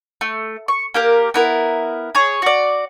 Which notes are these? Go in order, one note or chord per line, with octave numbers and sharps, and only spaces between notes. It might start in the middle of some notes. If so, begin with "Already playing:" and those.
A3
C#6
A#3 G4 A#4
B3 E4 A#4
G#4 C#5
F#4 D5